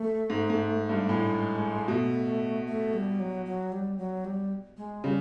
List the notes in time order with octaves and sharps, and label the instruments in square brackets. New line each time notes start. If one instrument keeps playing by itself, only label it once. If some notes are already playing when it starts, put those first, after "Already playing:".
Already playing: [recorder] A3
[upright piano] G#2
G#2
G2
[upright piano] A2 [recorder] G#3
[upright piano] B2 [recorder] A3
[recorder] A3
G3
F#3
F#3
G3
F#3
G3
G#3
[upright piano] C#3 [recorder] G3